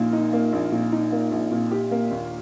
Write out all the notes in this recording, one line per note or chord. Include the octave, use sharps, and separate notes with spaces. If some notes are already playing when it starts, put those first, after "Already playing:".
Already playing: A#1 A#2 A#3 D#4
D#4
A#3
A#1
A#2
D#4
A#3
A#1
A#2
G4
A#3
D#2